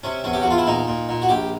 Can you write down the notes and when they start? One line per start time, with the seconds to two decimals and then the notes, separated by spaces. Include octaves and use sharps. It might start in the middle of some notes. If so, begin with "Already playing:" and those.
0.04 C3 C#4
0.24 E2 C#4
0.33 G4
0.42 F#4
0.46 E2 F4
0.58 E4
0.66 A#2 D#4
0.88 A#2
1.09 A#2
1.22 F#4
1.29 A#1 G4